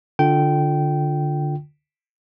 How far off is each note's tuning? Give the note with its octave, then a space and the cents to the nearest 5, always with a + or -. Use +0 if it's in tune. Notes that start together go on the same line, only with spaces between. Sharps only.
D3 +0 F4 +20 G5 -15